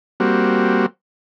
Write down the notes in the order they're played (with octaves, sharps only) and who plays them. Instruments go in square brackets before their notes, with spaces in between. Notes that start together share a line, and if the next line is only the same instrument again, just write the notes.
[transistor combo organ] G3 A#3 C4 F#4